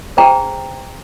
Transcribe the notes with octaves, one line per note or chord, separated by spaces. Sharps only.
D4 G#4 C5 G5 A#5